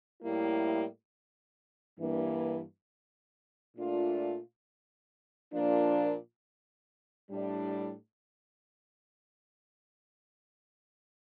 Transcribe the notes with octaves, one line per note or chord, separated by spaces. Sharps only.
A2 G3 A#3 E4
G2 E3 A#3
A#2 A3 D4 F4
A#2 F3 A#3 D4
A2 G3 D4